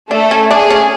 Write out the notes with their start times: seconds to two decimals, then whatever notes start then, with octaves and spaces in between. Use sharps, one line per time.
0.11 A3 D4 A4
0.31 C#4
0.51 D4 G#4
0.70 C#4